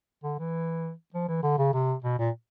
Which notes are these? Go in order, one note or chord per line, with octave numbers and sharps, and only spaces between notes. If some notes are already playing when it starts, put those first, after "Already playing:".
D3
E3
F3
E3
D3
C#3
C3
B2
A#2